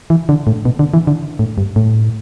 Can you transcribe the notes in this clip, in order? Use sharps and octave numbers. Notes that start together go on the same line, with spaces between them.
E3
D3
A2
B2
D3
E3
D3
A2
G2
A2